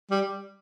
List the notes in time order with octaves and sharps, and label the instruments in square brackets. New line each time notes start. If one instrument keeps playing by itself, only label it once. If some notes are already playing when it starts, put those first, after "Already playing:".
[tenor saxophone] G3